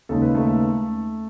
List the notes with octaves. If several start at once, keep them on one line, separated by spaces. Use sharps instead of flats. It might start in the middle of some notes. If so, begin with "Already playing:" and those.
D#2 C#3 G#3 D#4 A4
B4
A3 A4